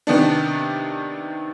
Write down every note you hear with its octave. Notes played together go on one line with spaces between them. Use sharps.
C3 D#3 B3 D4